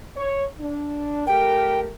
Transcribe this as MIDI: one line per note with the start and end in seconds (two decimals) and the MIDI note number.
0.16 0.45 73
0.59 1.26 62
1.27 1.90 57
1.27 1.90 67
1.27 1.90 70
1.27 1.80 79